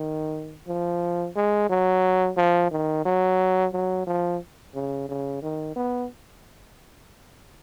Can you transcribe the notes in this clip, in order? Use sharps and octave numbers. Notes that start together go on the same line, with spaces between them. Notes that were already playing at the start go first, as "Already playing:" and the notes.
Already playing: D#3
F3
G#3
F#3
F3
D#3
F#3
F#3
F3
C#3
C#3
D#3
B3